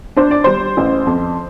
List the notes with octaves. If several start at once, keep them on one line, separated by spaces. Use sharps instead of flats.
D4 C5
D5
G3 C5
A1
F2